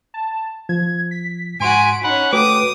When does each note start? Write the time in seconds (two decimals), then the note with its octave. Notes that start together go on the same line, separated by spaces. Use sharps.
0.14 A5
0.69 F3 G#6
1.11 B6
1.60 G#2 F#4 G#5 C6 D7
2.04 C#4 D#4 F#5 B5
2.33 A3 F#4 B4 G5 D6 D#6